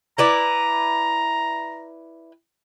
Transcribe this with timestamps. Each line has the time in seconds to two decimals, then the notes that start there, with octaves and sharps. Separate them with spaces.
0.18 E4 B4 D5 A#5